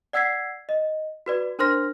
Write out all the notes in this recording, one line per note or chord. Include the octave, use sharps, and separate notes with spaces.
D5 F#5 E6 G#6 B6 C7
D#5
F#4 B4 D5
D4 A#4 C5 C6 F6 A#6